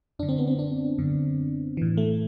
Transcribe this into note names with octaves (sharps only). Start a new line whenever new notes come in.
F#2 D3 D4
C4
B3
C4
D4
F#2 D3
A2 E3
A3